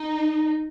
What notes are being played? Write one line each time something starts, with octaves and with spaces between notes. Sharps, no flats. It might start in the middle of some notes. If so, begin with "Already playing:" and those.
Already playing: D#4